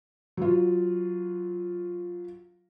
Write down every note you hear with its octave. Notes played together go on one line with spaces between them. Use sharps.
F#3 F4